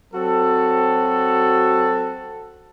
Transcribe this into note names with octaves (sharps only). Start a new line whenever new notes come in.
F#3 C4 F#4 A4